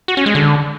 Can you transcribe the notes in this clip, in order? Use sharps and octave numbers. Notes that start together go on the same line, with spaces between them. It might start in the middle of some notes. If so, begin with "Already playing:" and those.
F#4
C#4
G#3
D3